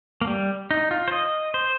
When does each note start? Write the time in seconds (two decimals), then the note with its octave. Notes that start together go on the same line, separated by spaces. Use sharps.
0.21 A#3
0.27 G3
0.71 D#4
0.91 F4
1.08 C5
1.12 D#5
1.54 C5